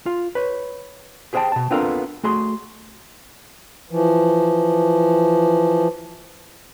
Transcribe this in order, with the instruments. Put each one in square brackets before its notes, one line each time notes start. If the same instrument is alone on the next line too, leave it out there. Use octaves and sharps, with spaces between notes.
[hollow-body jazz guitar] F4
B4 C#5
G4 G#4 C5 E5 G5 A5
B2 A5
B3 C4 D4 F4 A4 A#4
A3 F#4 G#4 C6
[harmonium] E3 F3